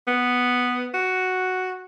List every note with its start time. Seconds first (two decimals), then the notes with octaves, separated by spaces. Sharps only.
0.08 B3
0.94 F#4